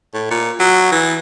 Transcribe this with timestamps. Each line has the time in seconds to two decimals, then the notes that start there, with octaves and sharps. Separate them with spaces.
0.14 A2
0.31 A#2
0.60 F#3
0.92 E3